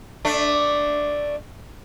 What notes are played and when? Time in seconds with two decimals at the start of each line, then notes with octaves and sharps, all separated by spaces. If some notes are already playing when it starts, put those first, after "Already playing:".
0.25 A3 D4